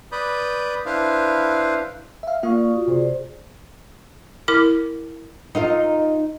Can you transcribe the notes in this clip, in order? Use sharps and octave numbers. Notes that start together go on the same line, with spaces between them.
B4 D5 B5 D#6 G6
D4 E4 B4 C5 F5
E5 F5
A#3 F4 D5 F5 C#6 D#6
F4 F#4
C3 G#4 C5 D5
E4 A#4 D6
D#4 F4 A#4